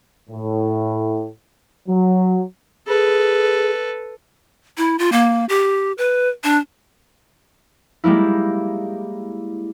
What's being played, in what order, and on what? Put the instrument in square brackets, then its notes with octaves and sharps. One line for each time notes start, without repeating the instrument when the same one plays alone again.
[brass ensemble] A2
F#3
[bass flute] G#4 [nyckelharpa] A4 B4
[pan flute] E4
F4
A#3
G4
B4
D4
[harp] G3 G#3 A#3 E4